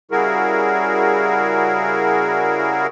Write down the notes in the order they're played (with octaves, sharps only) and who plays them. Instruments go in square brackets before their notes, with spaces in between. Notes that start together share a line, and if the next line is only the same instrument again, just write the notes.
[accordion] C#3 G3 E4 F#4 G#4 A#4